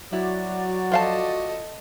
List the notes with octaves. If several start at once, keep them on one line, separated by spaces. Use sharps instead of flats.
F#3 E4 F#4 D5
F3 A4 D#5 F5 A5